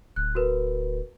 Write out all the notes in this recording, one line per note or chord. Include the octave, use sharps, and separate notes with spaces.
D1 F#6
F#4 A#4 B4